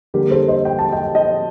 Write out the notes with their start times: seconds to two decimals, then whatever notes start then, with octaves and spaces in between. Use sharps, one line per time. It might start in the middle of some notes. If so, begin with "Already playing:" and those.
0.14 D3 G3 A#3 G4 A#4
0.31 A4 C5
0.48 C5 D#5
0.65 G5
0.79 A5
0.92 D#5 G5
1.15 D#5 G5